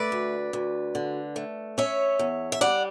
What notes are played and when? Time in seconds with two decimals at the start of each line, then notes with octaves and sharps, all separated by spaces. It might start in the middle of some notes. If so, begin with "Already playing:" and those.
Already playing: A3 B4 D5
0.12 D2
0.53 D2
0.95 D3
1.36 A3
1.78 C#4 C#5 E5
2.19 E2
2.52 E5
2.61 G3 D5 F#5